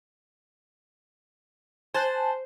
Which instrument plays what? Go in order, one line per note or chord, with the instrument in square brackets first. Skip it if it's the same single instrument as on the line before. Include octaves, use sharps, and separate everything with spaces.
[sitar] C5 [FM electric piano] G#5 A5 F#6